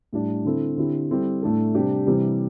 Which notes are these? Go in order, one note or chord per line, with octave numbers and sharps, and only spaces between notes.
A2 G3 D4
D3 C4 E4 A4
D3 C4 E4 G4
G3 C4 E4 A4
A2 A3 D4 A4
C3 G3 D4 G4
C3 E3 G3